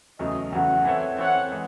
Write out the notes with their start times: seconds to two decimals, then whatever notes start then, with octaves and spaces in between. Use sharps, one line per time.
0.19 E2 C#3 F#3 A3 D#5
0.52 E2 C#3 F#3 A3 F#5
0.85 E3 C4 E4 A4 C#5
1.18 E3 C4 E4 A4 C#5 F#5
1.52 E3 G#3